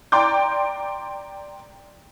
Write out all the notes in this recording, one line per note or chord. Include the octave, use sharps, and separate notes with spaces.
D5 G5 A#5 C6 D6 G6